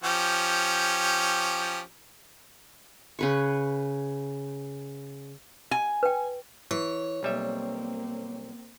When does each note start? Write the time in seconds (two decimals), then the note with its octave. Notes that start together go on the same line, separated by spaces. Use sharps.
0.04 F3 C#4 G4
3.19 C#3 B4 C#6
5.71 G#5
6.03 B4 G5
6.71 E3 C#5
7.23 B1 G3 A#3 C4 E5